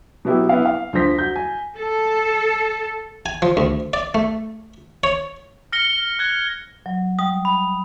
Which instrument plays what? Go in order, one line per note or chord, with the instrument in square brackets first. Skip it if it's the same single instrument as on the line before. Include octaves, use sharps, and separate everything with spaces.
[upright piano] B2 F#3 B3 E4 G4 G#4
B3 E4 F5
F5
D2 D3 F3 C5 A#6 B6
F#4 G6
G#5
[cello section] A4
[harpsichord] G#5
F3
D2
D5
A3
C#5
[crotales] F6 A#6 C#7 G7
F#6 G#6
[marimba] F#3
[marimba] G3 [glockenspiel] D#6
[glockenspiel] B5